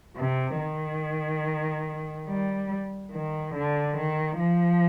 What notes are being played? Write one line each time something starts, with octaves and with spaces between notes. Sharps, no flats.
C3
D#3
G3
D#3
D3
D#3
F3